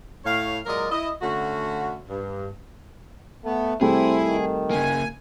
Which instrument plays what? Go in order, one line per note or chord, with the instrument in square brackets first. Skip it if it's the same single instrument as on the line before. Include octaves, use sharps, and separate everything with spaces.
[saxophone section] A2 C#5 F5
A#2 F#3 G#3 A#4 D5 D#5
E4 D#5
D3 A3 C#4 F#4
G2
[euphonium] A3 [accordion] B3
[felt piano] C3 G3 A3 [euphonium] C4 [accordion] E4 [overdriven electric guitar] G#4
[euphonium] D#3
[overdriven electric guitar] C#3 A#3 [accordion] G#5